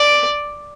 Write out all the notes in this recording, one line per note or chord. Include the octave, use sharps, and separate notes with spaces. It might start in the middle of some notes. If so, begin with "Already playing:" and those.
Already playing: D5